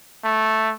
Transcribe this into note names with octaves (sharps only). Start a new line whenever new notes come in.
A3